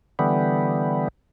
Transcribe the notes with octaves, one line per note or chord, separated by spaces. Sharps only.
D3 E3 G3 B3